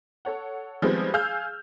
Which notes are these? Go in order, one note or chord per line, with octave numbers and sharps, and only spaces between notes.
A4 C#5 F#5
D#3 F3 G3 G#3 B3 C4
G#4 F5 E6 F6 G6